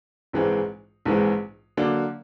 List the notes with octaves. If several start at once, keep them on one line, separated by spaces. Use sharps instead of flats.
A#1 G#2 E3 G#3 C4
A#1 G#2 E3 G#3 C4
D3 F#3 A#3 D4